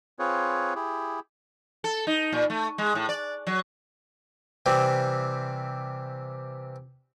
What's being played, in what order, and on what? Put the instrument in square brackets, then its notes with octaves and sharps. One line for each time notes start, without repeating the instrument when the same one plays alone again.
[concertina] C4 F4 G#4 B4 C#5
E4 G4 G#4
[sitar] A4
D#4
A#2
A3
G#3
A2
D5
F#3
[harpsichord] C3 E3 G3 C4